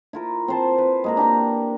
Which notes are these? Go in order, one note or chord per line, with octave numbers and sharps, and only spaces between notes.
E4 F4 A#4
C4 C5 A5
B4
G#3 A#3 A#4
D4 G4 G5 A#5